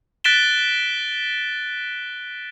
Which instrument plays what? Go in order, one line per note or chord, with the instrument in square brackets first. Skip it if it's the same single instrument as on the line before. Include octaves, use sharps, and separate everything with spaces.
[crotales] F#6 A6 B6 D7 E7 G7